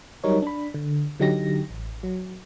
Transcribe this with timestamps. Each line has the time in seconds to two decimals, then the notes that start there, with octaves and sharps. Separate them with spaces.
0.24 F#3 G3 D#4 A#4 C#5
0.42 D4 B5
0.74 D3
1.20 D3 F#3 D#4 G4 A#6
1.70 A1
2.03 F#3